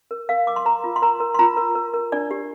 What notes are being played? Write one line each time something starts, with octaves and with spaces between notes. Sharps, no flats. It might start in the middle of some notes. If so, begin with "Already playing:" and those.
A#4
A#4 F5
A#4 D6
C6
A#4 A#5
F4
C6
A#4 A#5
A#4
C6
F4 A#5
A#4
A#4
A#4
D4 D5
G4